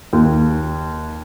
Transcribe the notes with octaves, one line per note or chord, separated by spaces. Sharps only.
D#2